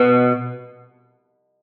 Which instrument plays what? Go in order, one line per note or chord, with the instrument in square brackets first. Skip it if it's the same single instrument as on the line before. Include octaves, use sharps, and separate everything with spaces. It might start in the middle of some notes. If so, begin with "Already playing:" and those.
Already playing: [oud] B2